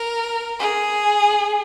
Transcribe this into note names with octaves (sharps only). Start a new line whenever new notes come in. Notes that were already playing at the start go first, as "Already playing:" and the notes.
Already playing: A#4
G#4